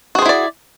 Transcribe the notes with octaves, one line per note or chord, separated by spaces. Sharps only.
E4 F#4 G#4 C5 D5